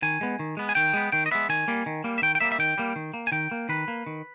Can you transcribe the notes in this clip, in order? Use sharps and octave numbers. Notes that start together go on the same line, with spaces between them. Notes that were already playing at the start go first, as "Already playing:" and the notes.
D#3 G#5
G#3 B3
D#3
G#3 B3
G#5
D#3 G5
G#3 B3
D#3 G5
D#5
G#3 B3 E5
D#3 G#5
G3 A#3
D#3
G3 A#3
E5
D#3 G5
G5
G3 A#3 E5
E5
D#3 G5
G3 A#3
D#3
A#3
G#5
D#3 G5
A#3
D#3 B4
A#3
D#3